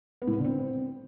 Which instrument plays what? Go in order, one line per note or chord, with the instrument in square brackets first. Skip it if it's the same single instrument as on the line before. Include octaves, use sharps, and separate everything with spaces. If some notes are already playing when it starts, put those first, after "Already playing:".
[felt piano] B3
A2
B3
D3
C4